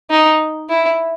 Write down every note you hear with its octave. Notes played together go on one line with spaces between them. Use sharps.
D#4
E4